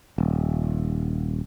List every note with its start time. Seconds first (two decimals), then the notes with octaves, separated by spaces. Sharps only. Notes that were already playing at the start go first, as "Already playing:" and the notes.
0.18 D#1